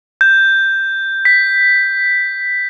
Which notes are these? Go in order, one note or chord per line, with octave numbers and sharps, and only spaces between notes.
G6
B6